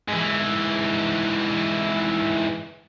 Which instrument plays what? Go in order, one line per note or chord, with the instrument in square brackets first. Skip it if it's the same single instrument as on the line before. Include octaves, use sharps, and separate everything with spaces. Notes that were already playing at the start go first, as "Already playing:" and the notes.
[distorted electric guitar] G#2 E3